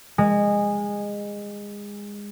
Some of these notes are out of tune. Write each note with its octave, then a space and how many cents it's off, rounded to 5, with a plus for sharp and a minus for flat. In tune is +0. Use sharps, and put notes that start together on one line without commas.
G#3 -20